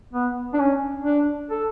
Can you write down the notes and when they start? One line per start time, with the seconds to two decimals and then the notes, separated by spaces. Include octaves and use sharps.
0.13 B3
0.53 D4
0.59 C#4
1.04 D4
1.50 A4